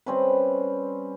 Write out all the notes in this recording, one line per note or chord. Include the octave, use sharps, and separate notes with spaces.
G3 C4 C#4 B4